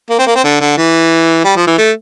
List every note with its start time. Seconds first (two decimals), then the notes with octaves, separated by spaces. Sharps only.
0.10 A#3
0.19 C4
0.27 A#3
0.35 C4
0.44 D3
0.60 D3
0.77 E3
1.45 G3
1.56 F3
1.67 E3
1.78 A3